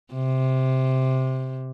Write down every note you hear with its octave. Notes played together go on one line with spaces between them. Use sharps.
C3